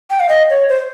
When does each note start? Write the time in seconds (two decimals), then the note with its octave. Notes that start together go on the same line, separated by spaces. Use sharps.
0.10 G5
0.20 F5
0.29 D#5
0.50 C#5
0.69 C5